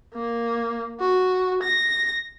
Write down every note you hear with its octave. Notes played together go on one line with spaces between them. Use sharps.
A#3
F#4
A#6